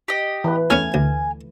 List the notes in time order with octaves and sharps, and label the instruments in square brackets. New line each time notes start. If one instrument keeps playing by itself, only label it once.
[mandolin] G4 D#5
[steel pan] E3 B4
[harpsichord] E2 B3 C#4 [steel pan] A3 [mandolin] G#5 F6
[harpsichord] D2